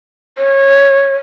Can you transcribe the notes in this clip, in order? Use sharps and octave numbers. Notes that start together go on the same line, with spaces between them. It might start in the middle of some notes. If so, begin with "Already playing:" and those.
C#5